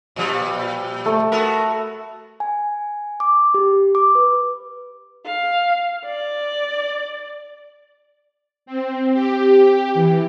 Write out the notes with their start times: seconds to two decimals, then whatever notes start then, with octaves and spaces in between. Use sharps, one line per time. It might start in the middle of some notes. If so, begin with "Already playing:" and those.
0.16 A#2 F3 G3
1.06 A3
1.32 B3 F#4 A#4
2.40 G#5
3.20 D6
3.54 G4
3.95 D6
4.15 B4
5.26 F5
6.05 D5
8.66 C4
9.13 G4
9.55 G4
9.94 E3